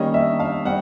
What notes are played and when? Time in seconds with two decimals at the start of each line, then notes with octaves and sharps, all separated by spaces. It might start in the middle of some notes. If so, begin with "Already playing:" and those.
Already playing: D#3 G3 A#3 C#4 D#5
0.14 E5
0.40 F5
0.65 G3 C4 F#5